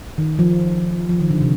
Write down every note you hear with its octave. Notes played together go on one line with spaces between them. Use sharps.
D#3
F3
F3
D#3
D3
C3